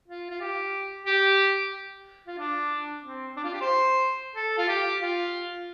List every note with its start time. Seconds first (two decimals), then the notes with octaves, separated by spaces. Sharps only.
0.08 F4
0.30 F4
0.41 G4
1.06 G4
2.27 F4
2.38 D4
3.04 C4
3.37 D4
3.44 F4
3.53 G4
3.61 C5
4.35 A4
4.58 F4
4.68 G4
5.01 F4